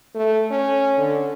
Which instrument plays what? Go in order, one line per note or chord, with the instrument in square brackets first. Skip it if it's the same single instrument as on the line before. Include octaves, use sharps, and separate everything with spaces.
[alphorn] A3
C#4
D3